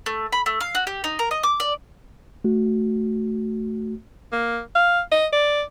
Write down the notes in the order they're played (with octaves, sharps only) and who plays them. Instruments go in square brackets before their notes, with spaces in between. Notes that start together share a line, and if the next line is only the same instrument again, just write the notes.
[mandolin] A3
B5
A3
F5
F#4
G4
D#4
A#4
D#5
D6
D5
[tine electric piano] A3 F#4
[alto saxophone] A#3
F5
D#5
D5